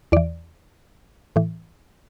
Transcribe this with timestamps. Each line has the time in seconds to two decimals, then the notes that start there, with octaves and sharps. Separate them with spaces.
0.12 E2 E3 D5
1.36 A2 E3